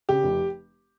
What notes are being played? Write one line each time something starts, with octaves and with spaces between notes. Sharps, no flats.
C#3 G4
F1